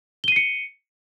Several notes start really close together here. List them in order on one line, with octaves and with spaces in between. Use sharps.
G7 D#7 C7 C#7